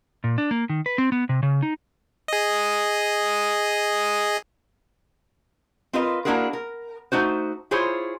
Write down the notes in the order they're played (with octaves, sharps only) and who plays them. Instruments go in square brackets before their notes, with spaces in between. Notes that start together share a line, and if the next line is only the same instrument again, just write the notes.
[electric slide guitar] A#2
D4
A#3
D#3
B4
C4
B3
C3
C#3
D#4
[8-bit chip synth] G#4 D#5
[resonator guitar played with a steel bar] C4 F4 A#4 B4 D#5
A#3 D4 E4 F#4 G#4 A#4
A#4
A3 D#4 F#4 C5
E4 F4 G#4 C5 C#5